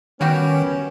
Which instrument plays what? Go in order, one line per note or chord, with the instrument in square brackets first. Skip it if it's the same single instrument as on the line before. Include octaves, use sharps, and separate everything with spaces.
[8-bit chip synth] D#3 [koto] G3 F#4 G4 [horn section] B3 C#4